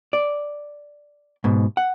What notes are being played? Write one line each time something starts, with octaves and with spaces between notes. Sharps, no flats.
D5
G#2 B2
F#5